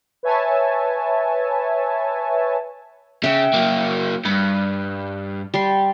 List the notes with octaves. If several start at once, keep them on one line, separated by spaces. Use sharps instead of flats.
B4 C#5 E5 G#5 A5
C#3 E5 F#5 G5
F#3 A#3
G2 B5
G3 C6